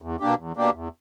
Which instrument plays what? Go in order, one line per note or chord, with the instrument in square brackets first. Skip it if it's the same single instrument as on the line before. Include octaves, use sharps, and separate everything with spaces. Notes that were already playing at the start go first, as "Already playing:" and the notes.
[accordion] E2
B2 A#3 D4 G4
E2
B2 A#3 D4 G4
E2